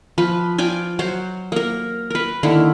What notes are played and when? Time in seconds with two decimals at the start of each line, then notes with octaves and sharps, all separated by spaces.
0.18 F3 B4
0.58 F4 D5 G5 G#5
0.99 F#3 F#4 C5
1.52 A#3 A#4
2.10 A#4 B4
2.43 D3 D#3 A#3 E4